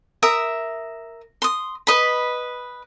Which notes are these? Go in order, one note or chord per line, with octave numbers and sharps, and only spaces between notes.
A#4 E5 D#6
C6 D#6
B4 D#5 B5